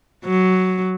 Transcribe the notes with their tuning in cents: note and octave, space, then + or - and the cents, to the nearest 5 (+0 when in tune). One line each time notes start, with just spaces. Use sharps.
F#3 +5